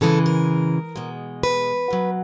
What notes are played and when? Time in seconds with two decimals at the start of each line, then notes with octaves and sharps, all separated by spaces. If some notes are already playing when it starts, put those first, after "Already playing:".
0.01 C#3 E3 G#3 A4
0.26 A#4
0.96 B2 G#3
1.43 B4
1.90 B2 F#3